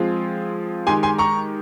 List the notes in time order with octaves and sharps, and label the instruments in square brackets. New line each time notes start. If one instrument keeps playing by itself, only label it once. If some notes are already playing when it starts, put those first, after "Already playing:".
Already playing: [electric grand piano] F3 G#3 C4 F4 G#4
[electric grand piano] D#3 G#3 D#4 G4 [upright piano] G#5 C6
[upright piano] G#5 C6
A#5 C#6